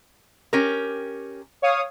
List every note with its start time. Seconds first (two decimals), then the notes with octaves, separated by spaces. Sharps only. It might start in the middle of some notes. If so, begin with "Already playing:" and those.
0.53 C#4 G4 A#4
1.62 C#5 F5 D#6